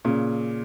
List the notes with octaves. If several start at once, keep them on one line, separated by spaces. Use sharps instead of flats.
A#2 C#3